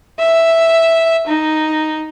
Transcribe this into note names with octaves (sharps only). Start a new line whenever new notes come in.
E5
D#4